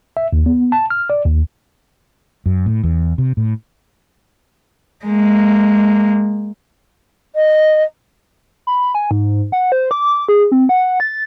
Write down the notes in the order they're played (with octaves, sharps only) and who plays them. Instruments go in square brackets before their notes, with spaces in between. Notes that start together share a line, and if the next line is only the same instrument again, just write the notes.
[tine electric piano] E5
D#2
B3
A5
F6
D5
D#2
[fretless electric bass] F#2
A2
E2
C3
A2
[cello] G#3 A#3
[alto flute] D#5
[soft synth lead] B5
G#5
G#2
F#5
C5
D6
G#4
C4
F#5
A6